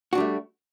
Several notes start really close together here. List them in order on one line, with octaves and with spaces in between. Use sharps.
F#4 D4 G3 A3